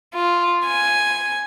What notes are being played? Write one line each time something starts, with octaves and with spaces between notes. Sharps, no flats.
F4
G#5